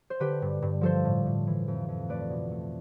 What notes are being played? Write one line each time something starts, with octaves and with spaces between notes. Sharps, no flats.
C5
D3 G4 B4
G2
G2
F3 A4 C5
A2
A2
E3
F2
F2
A3 B4 D5
B2
A3